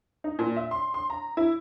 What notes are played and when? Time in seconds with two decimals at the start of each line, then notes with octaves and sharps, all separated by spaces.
0.24 D#4
0.39 A#2
0.56 E5
0.71 C6
0.94 C6
1.10 A#5
1.37 E4